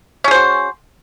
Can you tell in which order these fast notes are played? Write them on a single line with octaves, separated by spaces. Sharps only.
C#4 G#4 C5 F#4